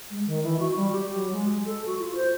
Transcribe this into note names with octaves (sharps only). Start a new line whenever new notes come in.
G#3
D#3
E3
F#4
G3
G4
F#3
G#3
A4
F#4
F4
C5